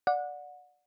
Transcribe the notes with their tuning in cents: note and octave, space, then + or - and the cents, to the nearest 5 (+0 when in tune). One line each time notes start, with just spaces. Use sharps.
D5 +0 F#5 -25